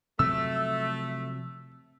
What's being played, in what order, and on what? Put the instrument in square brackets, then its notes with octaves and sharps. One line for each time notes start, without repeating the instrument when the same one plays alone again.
[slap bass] C3 F3 F#3 [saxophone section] A3 [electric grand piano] E6